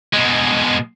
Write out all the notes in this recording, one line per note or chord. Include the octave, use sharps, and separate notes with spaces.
B2 G#3